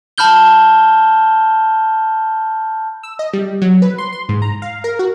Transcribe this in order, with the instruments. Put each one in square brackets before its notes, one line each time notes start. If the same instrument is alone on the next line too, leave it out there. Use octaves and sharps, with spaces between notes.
[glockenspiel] A5 B5 F6 G6 G7
[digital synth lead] E6
D#5
G3
F#3
B4
C6
C6
G#2
A#5
F5
A#4
F#4